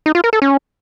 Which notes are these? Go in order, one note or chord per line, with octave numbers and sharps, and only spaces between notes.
D#4
F4
A#4
A4
C#4